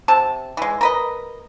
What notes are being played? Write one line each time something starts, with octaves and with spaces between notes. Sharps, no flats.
C3 A5
E3 G#3
A#4 B4 D#5